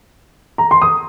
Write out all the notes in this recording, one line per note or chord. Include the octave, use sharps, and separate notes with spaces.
A#5
C6
D#6